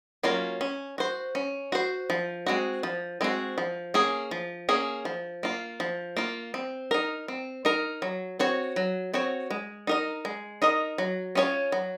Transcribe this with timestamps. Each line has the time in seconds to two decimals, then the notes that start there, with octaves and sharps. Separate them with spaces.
0.23 F#3 A#3 C#4 F4
0.61 C#4
0.98 F#4 C5
1.35 C#4
1.72 F#4 C5
2.10 F3
2.46 G#3 C4 F#4
2.83 F3
3.21 G#3 C4 F#4
3.58 F3
3.94 A#3 C#4 G#4
4.31 F3
4.69 A#3 C#4 G#4
5.05 F3
5.43 A#3 F4
5.80 F3
6.17 A#3 F4
6.54 C4
6.91 D#4 A#4
7.28 C4
7.65 D#4 A#4
8.02 F#3
8.39 C4 F#4 C#5
8.76 F#3
9.13 C4 F#4 C#5
9.50 G#3
9.87 D#4 A#4 D#5
10.25 G#3
10.62 D#4 A#4 D#5
10.98 F#3
11.35 C#4 F4 G#4 C#5
11.72 F#3